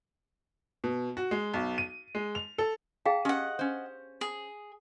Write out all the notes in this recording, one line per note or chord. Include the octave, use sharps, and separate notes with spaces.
B2
F#4
G#3
B1
D#7
G#3
F7
A4
G#4 F5 G5 A5
C#4 G4 D#5 F#5
C#4 C5
G#4